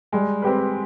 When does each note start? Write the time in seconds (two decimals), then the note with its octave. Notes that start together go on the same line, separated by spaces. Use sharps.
0.13 G3 G#3
0.42 C4 G4 B4